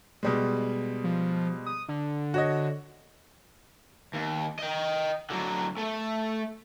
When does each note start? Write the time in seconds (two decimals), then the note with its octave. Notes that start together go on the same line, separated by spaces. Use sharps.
0.23 B2 G3 G#3
1.04 F3
1.66 D#6
1.89 D3
2.34 F#4 C#5 D#5
4.14 D#2
4.59 D#5 G5
5.30 D3 F#3
5.77 A3